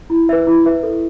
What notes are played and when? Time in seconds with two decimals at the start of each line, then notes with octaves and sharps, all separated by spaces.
0.10 E4
0.29 B4 E5
0.47 E4
0.66 B4 E5
0.83 A4